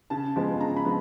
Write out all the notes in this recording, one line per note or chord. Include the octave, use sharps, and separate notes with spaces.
C#3 A5
F3 G#3 B3
C#3 A#5
B5
F3 G#3 B3